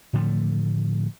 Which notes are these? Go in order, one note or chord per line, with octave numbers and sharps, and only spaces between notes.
A2 D3 F3 A3